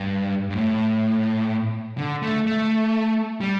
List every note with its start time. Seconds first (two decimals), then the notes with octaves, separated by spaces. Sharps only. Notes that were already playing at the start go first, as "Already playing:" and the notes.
Already playing: G2
0.50 G2
0.56 A2
1.98 D3
2.22 A3
2.46 A3
3.41 G3